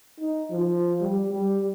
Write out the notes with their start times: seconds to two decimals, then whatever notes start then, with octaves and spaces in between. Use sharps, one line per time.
0.20 D#4
0.51 F3
1.01 G3
1.31 G3